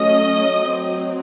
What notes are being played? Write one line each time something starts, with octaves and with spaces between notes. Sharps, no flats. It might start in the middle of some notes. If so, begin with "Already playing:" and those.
Already playing: F#3 A3 C#4 D#5
F#3 C4